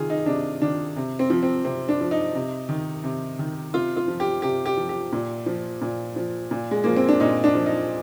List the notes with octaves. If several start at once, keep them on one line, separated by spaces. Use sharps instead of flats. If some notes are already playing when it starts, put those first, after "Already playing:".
Already playing: C3 D#3 F4 G#4
D#4
C3 D4
D#3 D4
C3
C4
F3
C4
C3 C4
D4
F3
D#4
C3
D#3
C3
D#3
C3 F4
F4
F3
G4
C3 G4
G4
F3
G4
A#2
F3
A#2
F3
A#2
G#3
F3 A#3
C4
D4
A#2 D#4
D4
F3
D#4